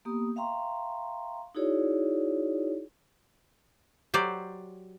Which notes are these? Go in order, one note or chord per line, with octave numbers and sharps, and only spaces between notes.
A#3 B3 G4 D#6
E5 F5 G5 A#5 C6 C#6
D#4 E4 F#4 G#4 C#5 D5
F#3 G4 C5 D5